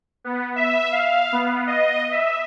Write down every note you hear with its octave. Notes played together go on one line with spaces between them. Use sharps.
B3
E5
F5
B3
D#5
E5